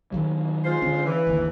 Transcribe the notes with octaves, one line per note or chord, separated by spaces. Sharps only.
D#3 F#3 G3
G#3 F4 C5
D3 C#4
E3
G1 D#2